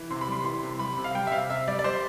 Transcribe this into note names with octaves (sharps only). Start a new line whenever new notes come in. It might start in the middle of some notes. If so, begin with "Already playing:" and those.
Already playing: E3
C3 C6
B5
G3 C6
E3 C6
C3
G3 B5
C3
F5
G3 G5
E5
C3 F5
C3 E5
G3 D5
D5
G3 C5